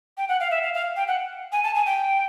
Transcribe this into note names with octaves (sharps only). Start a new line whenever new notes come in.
G5
F#5
F5
E5
F5
F5
G5
F#5
G#5
A5
G#5
G5